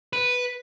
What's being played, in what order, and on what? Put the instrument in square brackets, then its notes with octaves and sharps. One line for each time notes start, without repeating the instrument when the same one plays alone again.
[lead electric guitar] B4